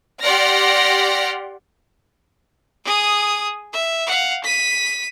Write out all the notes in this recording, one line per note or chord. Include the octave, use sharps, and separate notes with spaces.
G4 D5 F#5 C6 F6 A#6
G#4 D#6
E5
F5 F#5
B6 D#7